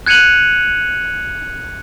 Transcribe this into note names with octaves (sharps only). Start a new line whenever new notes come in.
F#6 G#6 C#7 D#7 F7 F#7